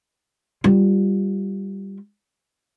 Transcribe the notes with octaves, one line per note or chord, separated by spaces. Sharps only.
G3 F4